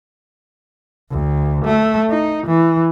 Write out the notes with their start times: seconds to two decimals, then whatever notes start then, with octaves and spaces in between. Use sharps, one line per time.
1.11 D2
1.65 A3
2.10 D#4
2.46 E3